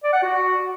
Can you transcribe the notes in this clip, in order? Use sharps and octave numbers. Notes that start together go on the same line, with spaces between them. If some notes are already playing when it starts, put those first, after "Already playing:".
D5
F#5
F#4